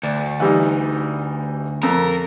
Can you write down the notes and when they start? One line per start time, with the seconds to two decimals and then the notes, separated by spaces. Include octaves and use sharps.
0.03 D2 D5
0.40 E3 G3 D#4
1.83 F2 A#4